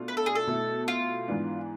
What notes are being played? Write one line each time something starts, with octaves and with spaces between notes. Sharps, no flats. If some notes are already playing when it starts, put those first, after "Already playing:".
Already playing: B2 A3 D4 F4
B4
A4
G#4
A4
B2 A3 E4
F4
G#2 E3 B3 D4